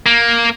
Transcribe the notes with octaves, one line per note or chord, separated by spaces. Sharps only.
A#3